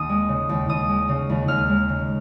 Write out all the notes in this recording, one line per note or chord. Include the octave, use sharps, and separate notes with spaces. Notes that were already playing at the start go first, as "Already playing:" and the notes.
Already playing: D#2 D#6
G#3
C#3
D#2
D#2 D#6
G#3
C#3
D#2
D#2 F6
G#3
C#3